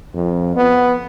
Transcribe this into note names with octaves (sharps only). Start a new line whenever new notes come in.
F2
B3